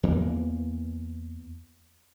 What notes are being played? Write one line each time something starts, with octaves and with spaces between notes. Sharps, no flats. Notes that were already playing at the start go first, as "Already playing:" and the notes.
E2 E3 A#3